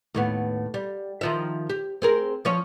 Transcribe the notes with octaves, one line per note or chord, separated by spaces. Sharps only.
D#2 A2 B3
G3
D#3 F3 E5
G4
C4 G#4 A#4
F3 C#4 C#5